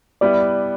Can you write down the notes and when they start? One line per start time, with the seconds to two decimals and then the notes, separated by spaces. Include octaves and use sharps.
0.21 G3 B3 E4 B4 D5